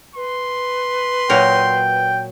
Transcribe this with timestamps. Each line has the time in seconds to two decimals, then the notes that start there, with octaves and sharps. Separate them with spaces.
0.15 B4 C6
1.30 A#2 F#3 A#4 G5